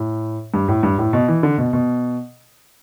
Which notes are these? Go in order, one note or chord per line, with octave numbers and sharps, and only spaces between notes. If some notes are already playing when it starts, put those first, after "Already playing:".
Already playing: A2
G2
A2
G2
A2
B2
E3
D3
B2
B2